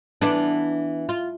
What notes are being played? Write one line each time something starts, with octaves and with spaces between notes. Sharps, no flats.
E3 B3 D4
F4